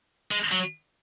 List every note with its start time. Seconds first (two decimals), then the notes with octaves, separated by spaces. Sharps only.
0.31 G#3
0.52 F#3